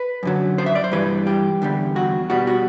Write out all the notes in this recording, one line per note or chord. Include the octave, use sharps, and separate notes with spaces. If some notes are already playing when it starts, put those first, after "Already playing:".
Already playing: B4
F#2 D3 F#3
C5
E5
D5
C5
G2 E3 G3 B4
G4
E2 D3 G3
F#4
B2 G3 F#4
F#4